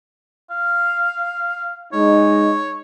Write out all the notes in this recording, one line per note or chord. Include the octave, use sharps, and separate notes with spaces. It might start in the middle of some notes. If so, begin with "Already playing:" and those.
F5
G#3 D#4 C#5